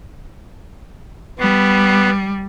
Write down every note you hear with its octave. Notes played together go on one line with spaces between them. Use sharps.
G3 B3